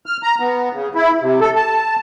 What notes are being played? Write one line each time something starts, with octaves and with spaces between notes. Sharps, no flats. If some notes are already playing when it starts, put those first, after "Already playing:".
F6
A#5
B3
C#3
E4
C3
A4
A5